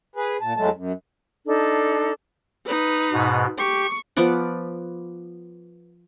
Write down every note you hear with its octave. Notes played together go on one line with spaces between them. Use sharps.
G#4 B4
A#2 A5
E2 F#3 G#3 A3 A5
F#2
D4 D#4 A4
D#4 B4
G#2 B2
G4 C#6
F3 B3 D5 F#5